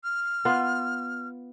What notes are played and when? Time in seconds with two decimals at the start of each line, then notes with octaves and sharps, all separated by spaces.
0.04 F6
0.45 B3 F4